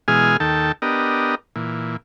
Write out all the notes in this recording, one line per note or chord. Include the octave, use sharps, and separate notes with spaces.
B2 E3 G#3 G#4 G#5 F6
D#2 D#3 A4 G5 A5
B3 D4 G4 A#4 D#5
A#2 E3